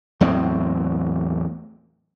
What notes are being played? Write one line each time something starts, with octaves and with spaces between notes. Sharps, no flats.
E2 A2 F#3 C4